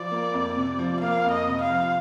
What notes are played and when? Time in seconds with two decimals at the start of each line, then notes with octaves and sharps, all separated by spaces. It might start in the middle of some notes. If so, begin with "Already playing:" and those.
Already playing: F3 D5
0.11 A#3
0.34 F2
0.57 C3
0.79 F3
1.01 A#3 F5
1.24 F2
1.32 D#5
1.47 C3
1.62 F5
1.70 F3